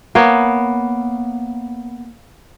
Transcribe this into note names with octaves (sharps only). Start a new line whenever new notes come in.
A#3 B3 C#5